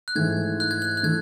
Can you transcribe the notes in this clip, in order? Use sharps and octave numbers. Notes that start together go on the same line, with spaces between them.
F#6
G#2 E3 A3 G#6
F#6
G#6
F#6
F#6
E3 A3 G#6